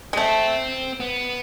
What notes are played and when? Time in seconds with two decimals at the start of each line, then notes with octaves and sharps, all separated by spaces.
0.13 G#3
0.17 A3 C4
1.00 B3